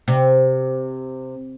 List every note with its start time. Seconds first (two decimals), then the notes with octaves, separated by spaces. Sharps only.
0.08 C3